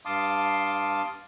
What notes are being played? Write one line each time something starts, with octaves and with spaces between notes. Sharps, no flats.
G2 F5 A5 C6 D6 D#6